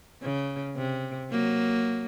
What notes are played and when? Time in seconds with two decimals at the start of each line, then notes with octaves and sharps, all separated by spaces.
0.22 C#3
0.77 C3
1.32 F#3 A#3